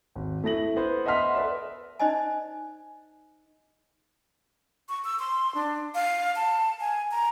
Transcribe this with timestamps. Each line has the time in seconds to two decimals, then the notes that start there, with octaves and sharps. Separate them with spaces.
0.15 G#1
0.44 A3 E4 A#6 F#7
0.77 B3 C5
1.06 D#5 E5 F#5 C6 F6 B6
1.35 A4 B4 D5 E5
1.99 D#4 C5 D5 D#5 G#5
4.89 C#6
5.05 E6
5.19 C6
5.55 D4
5.95 F5
6.36 A5
6.80 G#5
7.11 A#5